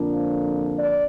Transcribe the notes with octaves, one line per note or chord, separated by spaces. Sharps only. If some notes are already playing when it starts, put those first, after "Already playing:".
Already playing: F2 D3 F3 A#3 D4
D5